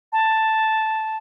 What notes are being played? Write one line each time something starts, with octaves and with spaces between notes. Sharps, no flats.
A5